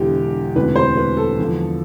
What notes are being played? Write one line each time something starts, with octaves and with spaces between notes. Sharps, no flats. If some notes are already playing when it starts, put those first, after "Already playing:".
Already playing: E1 E2 D3 G4
E1 D2 C3 E3 B4
C5
B4
A4
E2 D3 F3